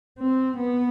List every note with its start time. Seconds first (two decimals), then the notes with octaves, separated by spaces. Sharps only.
0.19 C4
0.58 B3